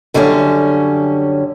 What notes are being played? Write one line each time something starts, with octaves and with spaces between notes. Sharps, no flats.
F#2 D3 G3 C#4